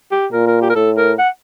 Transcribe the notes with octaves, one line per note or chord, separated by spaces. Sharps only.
G4
A#2 A#4
A#4
G4
A#4
A2 A4
A#4
F#5